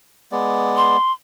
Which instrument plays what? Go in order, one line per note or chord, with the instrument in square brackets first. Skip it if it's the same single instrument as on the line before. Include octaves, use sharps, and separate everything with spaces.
[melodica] G#3 B3 D5
[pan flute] C6